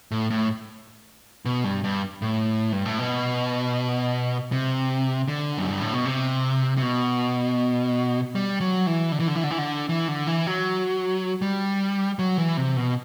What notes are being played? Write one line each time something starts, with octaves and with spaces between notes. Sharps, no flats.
A2
A2
B2
G2
G2
A2
G2
A2
B2
C3
D3
F#2
G2
A2
B2
C3
C3
B2
G3
F#3
E3
D3
E3
D3
E3
D3
E3
D3
E3
D3
E3
F#3
G3
F#3
E3
C3
B2